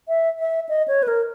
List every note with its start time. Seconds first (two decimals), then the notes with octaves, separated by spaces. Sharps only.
0.08 E5
0.39 E5
0.69 D#5
0.88 C#5
1.03 B4
1.08 A#4